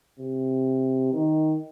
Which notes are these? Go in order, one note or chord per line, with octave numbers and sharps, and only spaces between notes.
C3
D#3